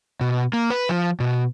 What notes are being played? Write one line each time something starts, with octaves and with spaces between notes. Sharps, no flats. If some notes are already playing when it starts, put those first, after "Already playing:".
B2
A#3
B4
F3
B2